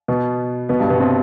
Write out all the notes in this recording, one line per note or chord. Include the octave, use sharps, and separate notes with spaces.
B2 B3
B2 B3
G2 G3
B2 B3
C3 C4